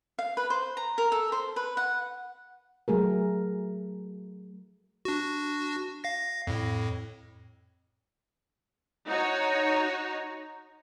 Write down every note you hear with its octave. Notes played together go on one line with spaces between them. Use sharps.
F5
B4
C5
A#5
A#4
A4
C5
B4
F#5
F#3 A3 G#4 A#4
D4 F#4
F5 A#6
F2 A2
D#4 F#4 C#5